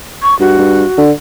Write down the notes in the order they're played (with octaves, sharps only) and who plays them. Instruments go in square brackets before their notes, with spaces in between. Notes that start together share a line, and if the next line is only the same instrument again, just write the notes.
[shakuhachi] C#6
[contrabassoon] G2 [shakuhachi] F#4
[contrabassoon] G2
D3